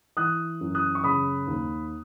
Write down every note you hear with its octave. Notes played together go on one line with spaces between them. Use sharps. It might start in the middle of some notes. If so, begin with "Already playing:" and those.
E3 D#6 F#6
F#2
D#6 F#6
C#6
C#3 B5 D#6
D#2